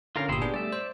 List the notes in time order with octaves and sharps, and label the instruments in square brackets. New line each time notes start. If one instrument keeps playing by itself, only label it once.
[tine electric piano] D3 C#4 [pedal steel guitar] F4 A#4 F5
[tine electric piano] G1 A#2 D#6 [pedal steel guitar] E4 G4 C6
[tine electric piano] B3 D4 G#4 [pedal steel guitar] G4
[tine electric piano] G3 A3 [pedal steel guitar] D5 E5
[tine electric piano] C5